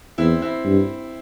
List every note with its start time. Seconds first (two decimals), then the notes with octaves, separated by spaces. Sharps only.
0.18 E2 C4 E4
0.42 C4 E4
0.65 G2